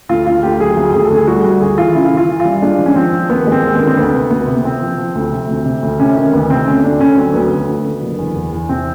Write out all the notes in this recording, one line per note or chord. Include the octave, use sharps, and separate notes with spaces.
D2 F4
D2 F4
D2 G4
F#3 G#4
D2
D2 G#4
A4
D2
G#4
G3 F#4
G3 F#4
D2 G#4
E3 F4
C#3 E4
E3
F4
E3
F4
G3
G#3 D4
F3
C#4
F3 C4
F3
D#2 B3
G#3
C4
D#2
B3
D3
C4
D2 B3
C3
D2 B3
C3
B3
C3 C4
F3
F3
D2
C3
D2
C3
D2
C3 C#4
D#3 C#4
D2 B3
C3 C4
D2 C#4
D2 D4
D3 C#4
F#3 C4
D2 B3
D2
D3
D3
F#1
E2
E2
E2
C3 C4